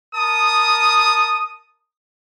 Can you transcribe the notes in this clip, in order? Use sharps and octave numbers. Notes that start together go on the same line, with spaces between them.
A#4 A5 D#6